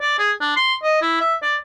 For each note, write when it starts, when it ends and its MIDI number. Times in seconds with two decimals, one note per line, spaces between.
0.01 0.17 74
0.18 0.32 68
0.40 0.56 62
0.56 0.74 84
0.83 0.97 75
1.02 1.18 64
1.20 1.35 76
1.42 1.56 74